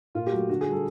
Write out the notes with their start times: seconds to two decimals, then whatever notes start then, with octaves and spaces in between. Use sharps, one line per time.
0.15 A#2 F4
0.27 G4
0.32 F#3 A3 F#4
0.49 D3 F#4
0.61 G#4
0.67 G3
0.72 A4